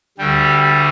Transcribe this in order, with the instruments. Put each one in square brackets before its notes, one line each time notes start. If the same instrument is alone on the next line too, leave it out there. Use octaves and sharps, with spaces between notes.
[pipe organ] D2 D3 G3 G4